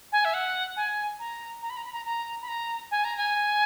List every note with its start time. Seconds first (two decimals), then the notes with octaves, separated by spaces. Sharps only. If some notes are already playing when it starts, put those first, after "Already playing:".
0.12 G#5
0.25 E5
0.33 F#5
0.76 G#5
1.19 A#5
1.62 A#5
1.70 B5
1.77 A#5
1.85 B5
1.93 A#5
2.05 A#5
2.42 B5
2.48 A#5
2.91 G#5
3.04 A#5
3.17 G#5